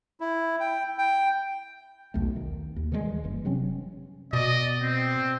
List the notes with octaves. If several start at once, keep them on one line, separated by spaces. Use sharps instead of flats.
E4
G5
G5
B1 E2 A3
D#3
D#2
D#3 E3 G3 G#3
F#1 E3
C3 F#3 C4 C#4
B2 D5 D#5
C4